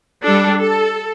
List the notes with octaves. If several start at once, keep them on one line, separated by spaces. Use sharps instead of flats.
G3 D4 A4
A4